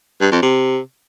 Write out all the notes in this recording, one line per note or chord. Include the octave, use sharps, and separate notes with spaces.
G2
F2
C3